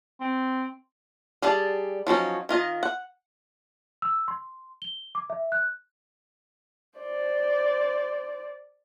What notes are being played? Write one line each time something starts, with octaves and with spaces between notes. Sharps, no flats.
C4
G3 G#4 D5 A5
F3 F#3 C#4 D#4
D#3 F4 D#5
F#5
E6
C6
G7
D6
E5
F#6
C5 D5